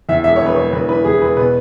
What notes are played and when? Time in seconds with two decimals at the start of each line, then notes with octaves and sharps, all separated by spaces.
0.09 E2 E5
0.24 E1 E5
0.36 C#5
0.41 E1 B4
0.56 E1 C#5
0.73 E2 B4
0.89 E3 B4
1.04 E2 G#4
1.21 E2 B4
1.37 B2 B4